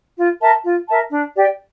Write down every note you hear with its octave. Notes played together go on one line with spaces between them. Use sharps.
F4
A#4 E5 A5
F4
A#4 E5 A5
D4
G4 D5 G5